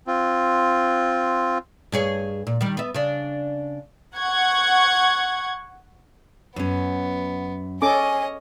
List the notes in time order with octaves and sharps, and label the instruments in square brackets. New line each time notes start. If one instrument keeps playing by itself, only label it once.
[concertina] C4 F4
[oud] G2 G#4 C#5
A#2
D#3 G3
B3 E5
C#3 D4
[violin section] F#5 C#6 G#6
[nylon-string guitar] F#2 C#4 [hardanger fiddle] B3
[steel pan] C#4 A4 D6 [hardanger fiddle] C#5 D#5 [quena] G#5